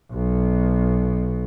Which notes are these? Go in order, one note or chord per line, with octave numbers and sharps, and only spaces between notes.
B1 B2